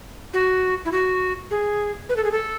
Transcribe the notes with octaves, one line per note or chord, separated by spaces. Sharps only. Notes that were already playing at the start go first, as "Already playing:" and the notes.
F#4
E4
F#4
G#4
B4
A4
G#4
A4